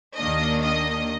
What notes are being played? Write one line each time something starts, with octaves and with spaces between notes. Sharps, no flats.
D#2 D#3 A#3 D4 D#5
D#5